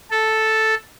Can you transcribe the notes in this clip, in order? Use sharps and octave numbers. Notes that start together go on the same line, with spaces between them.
A4